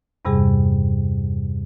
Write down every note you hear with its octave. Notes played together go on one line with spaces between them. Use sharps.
E2 G2 C3 G3 G#4